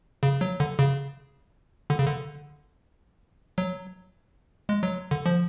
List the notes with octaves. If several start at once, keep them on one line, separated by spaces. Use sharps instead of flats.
C#3
F#3
D3
C#3
D3
C#3
D3
F#3
G#3
F#3
D3
F3